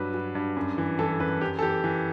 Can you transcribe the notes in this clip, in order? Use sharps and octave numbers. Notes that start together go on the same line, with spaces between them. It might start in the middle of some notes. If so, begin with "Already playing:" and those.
Already playing: G2 F#3 B4
F#3
G2
F#2
E3
E3 A4
F#2 B4
F#2 G4
A4
E3 G4
E3